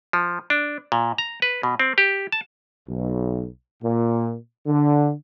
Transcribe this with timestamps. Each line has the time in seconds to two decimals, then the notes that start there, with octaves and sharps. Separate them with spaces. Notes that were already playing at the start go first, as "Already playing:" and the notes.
0.13 F3
0.50 D4
0.92 A#2
1.18 A#5
1.42 B4
1.63 B2
1.79 C4
1.98 G4
2.32 A5
2.89 B1
3.83 A#2
4.67 D3